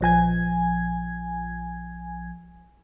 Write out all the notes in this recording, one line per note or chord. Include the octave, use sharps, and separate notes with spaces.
A#1 F3 G#5 G#6